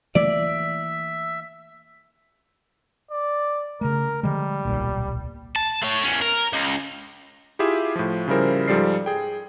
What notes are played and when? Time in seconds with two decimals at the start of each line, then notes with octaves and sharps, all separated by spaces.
0.15 E3 A3 A#3 D5 E5
3.11 D5
3.81 C#3 A3 A#4
4.23 D3 F3 G3 G#3
4.65 D1 B1 A#2
5.56 A5
5.83 A3 C#5
6.03 E2 C#4
6.22 A#4
6.53 C#2
7.59 E4 F4 G4 G#4 E5
7.96 A2 F3
8.28 C#3 F3 G3 E4 A#4 C5
8.68 G#2 F3 G3 A4 D5 C7
9.06 G#4 G5